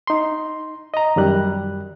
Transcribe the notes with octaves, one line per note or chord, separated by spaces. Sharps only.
D#4 C6
D#5 A#5
F#2 D#3 G3 F#6